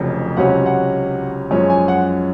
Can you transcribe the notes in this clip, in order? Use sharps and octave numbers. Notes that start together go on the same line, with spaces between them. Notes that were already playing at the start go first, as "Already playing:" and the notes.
Already playing: F1 F2 C#3 F#3
C#2 C3 F#3 C#4 F#5
F#5
F#2 F3 G#3 C#4
G#5
F#5